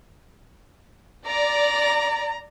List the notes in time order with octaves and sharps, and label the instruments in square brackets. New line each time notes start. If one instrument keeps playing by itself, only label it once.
[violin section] D5 [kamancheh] A#5